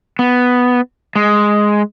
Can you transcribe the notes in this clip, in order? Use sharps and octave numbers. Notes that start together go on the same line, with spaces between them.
B3
G#3